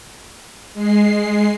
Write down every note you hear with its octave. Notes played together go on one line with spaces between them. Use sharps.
G#3 C7